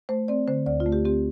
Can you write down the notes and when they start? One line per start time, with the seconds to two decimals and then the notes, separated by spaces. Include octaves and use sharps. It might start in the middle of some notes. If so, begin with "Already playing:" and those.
0.09 A3 C5
0.28 C4 D5
0.48 D3 C5
0.66 D2 D5
0.80 F4
0.86 A3
0.92 G4
1.05 C4 G4